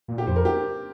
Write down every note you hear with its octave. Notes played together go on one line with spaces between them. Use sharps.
A#2
G4
F2 C5
A#4
G4